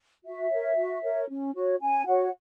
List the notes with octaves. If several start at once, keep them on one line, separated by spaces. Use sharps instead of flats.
F#4 E5
A#4 C#5
F#4
A#4 C#5
C#4
F#4 C#5
C#4 G#5
F#4 C#5 F#5